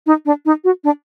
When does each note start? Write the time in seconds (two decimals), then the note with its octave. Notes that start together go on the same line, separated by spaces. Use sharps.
0.06 D#4
0.25 D4
0.45 D#4
0.64 F#4
0.84 D4